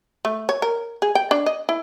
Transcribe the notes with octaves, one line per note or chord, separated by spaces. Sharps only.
A3
C#5
A#4
G#4
G5
D4
D#5
E4